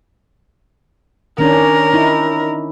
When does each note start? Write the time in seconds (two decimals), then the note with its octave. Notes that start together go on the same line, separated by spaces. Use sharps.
1.38 D#3 C#4 D4 A#4
1.93 D#4 E4